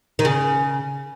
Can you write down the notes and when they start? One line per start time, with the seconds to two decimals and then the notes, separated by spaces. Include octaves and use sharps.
0.19 D#3
0.25 C#3